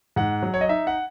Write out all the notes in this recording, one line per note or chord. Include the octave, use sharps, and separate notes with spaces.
G#2 F#5
F#3
C#5
D#5
D#4 E5
F#5